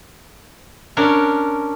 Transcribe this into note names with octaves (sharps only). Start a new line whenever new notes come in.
C#4 D4 A#4